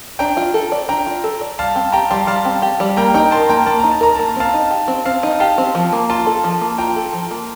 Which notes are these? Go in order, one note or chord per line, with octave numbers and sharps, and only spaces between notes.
D4 G5 A#5
F4
A4
D5
D4 G5 A#5
F4
A4
D5
G3 F5 A5
C4
G4 G5 A#5
G3 A5 C6
G3 F5 A5
C4
G4
G3
A#3 G5 A#5
D#4 G5 A#5
A#4 A5 C6
A#3 G5 A#5
A#3 A5
D#4 A#5
A5
A#4 A#5
A#3 A5
A#5
C4 F5 A5
D#4
G4
C4
C4 F5 A5
D#4
G4 F5 A5
C4
F3
A#3
F4 A5 C6
A4
F3
A#3
F4 G5 A#5
A4
F3
A#3